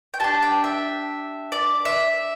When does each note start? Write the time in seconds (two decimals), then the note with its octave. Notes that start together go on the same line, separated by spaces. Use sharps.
0.14 G5
0.20 D4 G4 A5
0.42 G5
0.64 E5
1.52 D5
1.85 E5